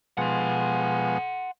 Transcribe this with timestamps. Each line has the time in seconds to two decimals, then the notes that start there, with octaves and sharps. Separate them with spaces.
0.18 B2 F3 G#3 F#5 C6